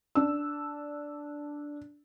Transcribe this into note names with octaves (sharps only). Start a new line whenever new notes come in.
D4 E6